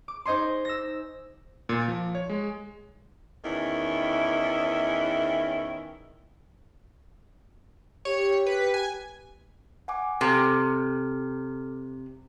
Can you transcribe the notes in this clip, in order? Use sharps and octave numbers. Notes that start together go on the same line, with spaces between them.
D6
D#4 C5 D#5 G#5 C6
E6 A#6
A#2
F3
C#5
G#3
E2 D#3 C#4 E4
G4 C#5
B4
G#5
F#5 G#5 D6
C3 A4 D6 F6